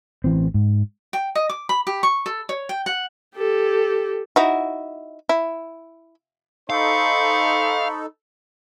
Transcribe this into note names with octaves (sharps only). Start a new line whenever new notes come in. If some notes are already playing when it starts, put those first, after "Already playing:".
A1 E3 C4
G#2
G5
D#5
D6
B5
G4
C#6
A4
C#5
G5
F#5
G4 A4
D#4 E4 F#4
E4
D#4 A4 C5 F5 B5 C#6